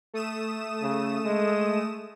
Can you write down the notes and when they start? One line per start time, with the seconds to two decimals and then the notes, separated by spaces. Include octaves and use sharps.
0.14 A3 D#6 E7
0.83 C#3
1.26 G#3